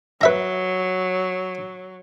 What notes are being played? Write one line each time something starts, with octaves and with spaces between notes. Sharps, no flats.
F#3 B4 E5 A#5